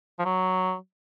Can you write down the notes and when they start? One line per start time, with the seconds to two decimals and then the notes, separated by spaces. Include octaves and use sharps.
0.19 F3
0.25 F#3